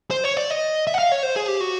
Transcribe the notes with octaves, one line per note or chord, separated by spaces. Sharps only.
C5
C#5
D5
D#5
E5
F#5
F5
C#5
C5
G#4
G4
F#4